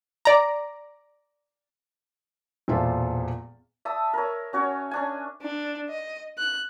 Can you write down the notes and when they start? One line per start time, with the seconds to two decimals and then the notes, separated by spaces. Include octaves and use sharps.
0.25 D5 A#5
2.68 E1 A#2 F3 F4 A4 E5
3.85 E5 A5 D#6 E6
4.13 A#4 C#5
4.53 C#4 F#4 C#5
4.91 C#4 D4 G#5
5.41 D4
5.89 D#5
6.38 F#6